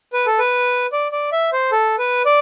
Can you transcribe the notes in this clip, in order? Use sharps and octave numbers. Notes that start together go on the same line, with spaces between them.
B4
A4
B4
D5
D5
E5
C5
A4
B4
D5